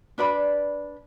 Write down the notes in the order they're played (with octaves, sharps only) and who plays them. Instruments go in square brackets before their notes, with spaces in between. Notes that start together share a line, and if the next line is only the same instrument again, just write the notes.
[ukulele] D4 B4 D5 B5